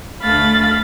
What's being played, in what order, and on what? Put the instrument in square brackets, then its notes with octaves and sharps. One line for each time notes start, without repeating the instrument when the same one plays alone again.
[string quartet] D2 A3 F5 B5 A6